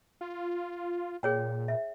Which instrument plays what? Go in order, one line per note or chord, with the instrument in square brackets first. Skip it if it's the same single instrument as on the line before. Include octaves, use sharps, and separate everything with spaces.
[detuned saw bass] F4
[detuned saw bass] A#2 [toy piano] G#4 C#5 G5
[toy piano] E5